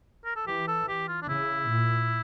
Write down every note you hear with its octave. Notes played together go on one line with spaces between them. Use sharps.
A#4
A4
E3 G4
A4
G4
F4
D4
C#3 E4
A#2